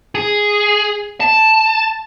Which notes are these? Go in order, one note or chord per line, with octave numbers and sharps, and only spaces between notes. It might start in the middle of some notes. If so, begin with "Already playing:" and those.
G#4
A5